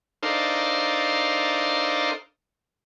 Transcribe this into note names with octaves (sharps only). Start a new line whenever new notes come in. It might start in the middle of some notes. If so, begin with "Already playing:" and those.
D4 D#4 A4 A#4 C5 F5